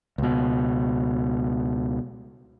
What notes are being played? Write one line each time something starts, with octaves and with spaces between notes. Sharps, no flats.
C#2 B2